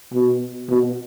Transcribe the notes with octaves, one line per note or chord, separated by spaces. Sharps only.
B2
B2